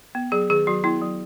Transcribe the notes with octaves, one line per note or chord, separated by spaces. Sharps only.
B3
F#3 G#4
D#3 G#4
F#3 F#4
B3 E4
F#3